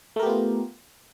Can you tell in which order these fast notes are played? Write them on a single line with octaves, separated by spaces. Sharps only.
A3 A#4 G4 B3 F4